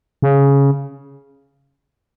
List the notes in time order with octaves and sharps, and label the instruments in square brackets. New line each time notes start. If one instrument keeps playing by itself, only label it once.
[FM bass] C#3